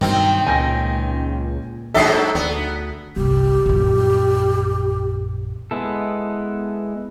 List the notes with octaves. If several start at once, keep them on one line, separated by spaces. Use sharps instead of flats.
G2 B2 D#3 F#3 C4
C#2 A#2 G#5 G6 A#6
G#2 F#3 D4 A4 E5 D#6 C7
D2 B3
G1 C2 G4
A#1 F#2
G#3 B3 E4 A4